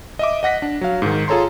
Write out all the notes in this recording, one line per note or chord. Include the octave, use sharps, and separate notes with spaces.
D#5 E5 D6
D#5 F#5 A#6 B6
D4
F#3 F5
G#2 D#3
F4 G#4 A4 C#5 A#5 C6